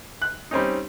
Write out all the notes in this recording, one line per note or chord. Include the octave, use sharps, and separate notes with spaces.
F#6
G3 C4 C#4 D#4